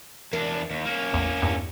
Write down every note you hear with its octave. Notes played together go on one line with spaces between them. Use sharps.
E2 D4 A#4
D#2
A#3 C#4
A1 E2
E2 G2